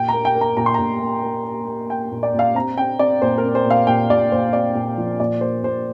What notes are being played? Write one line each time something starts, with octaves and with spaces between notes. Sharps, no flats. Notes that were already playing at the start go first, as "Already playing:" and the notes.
Already playing: A#2 G5
A#5
A#3
G5
A#3
A#5
A#2 A#5
C6
A#2 A#5
A#3
A#3
A#3
A#3
A#3 G5
A#2
D5
A#2 F5
C4 A#5
C4 G5
C4 D5
A#2 C5
A#4
C4
C5
A#2
F5
A#2 G5
A#2 D5
A#2 C5
C4 D5
A#2
F3
A#2 D5
A#3 C5
A#2 C5